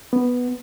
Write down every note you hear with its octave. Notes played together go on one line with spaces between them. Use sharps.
B3